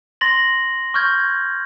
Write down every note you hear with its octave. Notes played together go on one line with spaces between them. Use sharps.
C6 A6 A#6 F#7
C#6 F6 G6 G#6